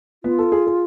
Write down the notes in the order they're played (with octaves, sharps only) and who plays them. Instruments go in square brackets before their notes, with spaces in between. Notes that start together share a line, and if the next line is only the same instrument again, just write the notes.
[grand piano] B3 [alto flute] F4
[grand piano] A4
G#4
G#4